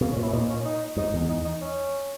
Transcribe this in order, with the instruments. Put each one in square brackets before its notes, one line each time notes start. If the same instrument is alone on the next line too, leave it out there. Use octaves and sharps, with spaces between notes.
[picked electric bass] B2 [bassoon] A#3
[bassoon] C#4
[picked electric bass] A#2
[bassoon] E4
C#4
[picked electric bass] A#2 [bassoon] D#4
[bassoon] C#4
D#4
[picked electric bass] G#2 [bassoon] D#4
[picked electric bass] E2
[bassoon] D#4
D#4
C#4